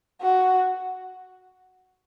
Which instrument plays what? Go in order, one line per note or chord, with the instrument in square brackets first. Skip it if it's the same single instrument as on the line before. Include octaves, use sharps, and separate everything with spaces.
[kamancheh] F#4